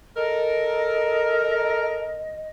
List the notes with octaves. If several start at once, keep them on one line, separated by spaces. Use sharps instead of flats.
A4 A#4 D#5